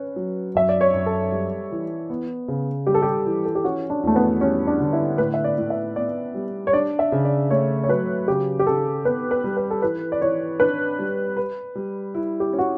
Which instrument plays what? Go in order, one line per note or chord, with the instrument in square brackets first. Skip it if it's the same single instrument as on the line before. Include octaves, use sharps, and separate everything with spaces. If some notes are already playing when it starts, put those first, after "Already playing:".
Already playing: [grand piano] C#4 [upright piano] B4
[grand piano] F#3
[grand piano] F#2 [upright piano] E5
[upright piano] D5
C#5
[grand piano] F#2
[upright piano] A4
[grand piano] G3
E3
B3
C#3
[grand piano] G3 [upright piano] G4
[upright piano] A4
G4
[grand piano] E3
[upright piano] A4
G4
[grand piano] C#4 [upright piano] F#4
[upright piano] D4
[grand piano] E2 [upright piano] A3
[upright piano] B3
[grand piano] G3 [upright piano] C#4
[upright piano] D4
[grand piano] D3
[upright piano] E4
[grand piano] A2 [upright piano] B4
[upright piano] E5
D5
[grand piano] A2
[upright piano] E5
[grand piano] B3 [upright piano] D5
[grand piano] G3
[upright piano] C#5
[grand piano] D4 [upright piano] D5
[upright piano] E5
[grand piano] C#3
[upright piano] D5
[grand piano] A3 [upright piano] C#5
[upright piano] C#5
[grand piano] F#3 [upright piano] B4
[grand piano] C#3 [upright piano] G4
[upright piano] G4
[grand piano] C#3 [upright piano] A4
[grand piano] B3 [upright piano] B4
[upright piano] B4
[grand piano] G3
[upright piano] B4
A4
[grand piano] E3 [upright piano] B4
[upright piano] D5
[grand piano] E3 [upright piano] C#5
[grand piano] D4 [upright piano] B4
[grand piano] G3
B4
G3
E4
[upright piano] G4
[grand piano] C#4
[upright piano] F#4